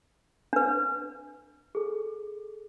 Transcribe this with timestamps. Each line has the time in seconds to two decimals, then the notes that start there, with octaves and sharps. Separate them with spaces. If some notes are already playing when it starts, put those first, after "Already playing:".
0.53 D4 B4
1.75 G#4 A4